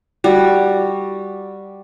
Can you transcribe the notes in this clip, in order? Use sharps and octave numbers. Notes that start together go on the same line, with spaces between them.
G3 F#4